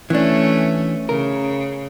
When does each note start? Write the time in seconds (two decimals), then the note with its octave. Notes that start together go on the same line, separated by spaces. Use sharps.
0.10 E3 A3 C#4 D4
1.09 C#3 A#4